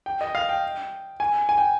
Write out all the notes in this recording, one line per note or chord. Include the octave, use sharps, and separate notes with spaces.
G5
D#5
F5
G5
G#5
G#5
G5